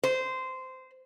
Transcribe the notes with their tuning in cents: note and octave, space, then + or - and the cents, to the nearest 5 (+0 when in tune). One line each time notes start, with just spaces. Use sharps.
C5 -15